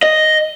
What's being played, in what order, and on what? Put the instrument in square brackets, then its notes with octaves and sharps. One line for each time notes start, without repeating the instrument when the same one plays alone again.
[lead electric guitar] D#5